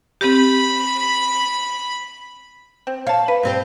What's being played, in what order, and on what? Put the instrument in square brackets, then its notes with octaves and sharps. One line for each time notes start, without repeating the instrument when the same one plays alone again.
[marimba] C4 G4 [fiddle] B5
[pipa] C4
[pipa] C#5 A5 [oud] F5
[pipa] B4
[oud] G2 C4 G4